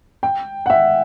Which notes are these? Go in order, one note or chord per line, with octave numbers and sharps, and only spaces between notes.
G5
F#5
E5